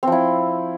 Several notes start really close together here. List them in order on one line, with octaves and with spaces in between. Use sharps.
C4 F3 E4